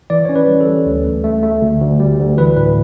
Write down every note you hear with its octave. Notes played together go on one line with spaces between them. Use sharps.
E3 D5
C#4 C#5
B4
G3
A4
G3
D2
A3
A3
A3
D2
D2
G3
D2
E3 B4
A2 B4